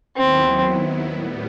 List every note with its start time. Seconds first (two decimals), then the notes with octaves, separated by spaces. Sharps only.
0.16 D#2 D#3 F#3 B3 C4 E4
1.14 A2 G3 B3